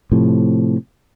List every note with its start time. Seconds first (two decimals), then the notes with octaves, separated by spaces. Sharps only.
0.12 A2 C3 F3